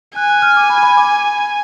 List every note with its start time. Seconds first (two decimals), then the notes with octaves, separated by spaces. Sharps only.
0.16 G#5 F#6
0.30 F#6
0.42 F6
0.57 D6
0.70 B5
0.83 B5
0.97 D6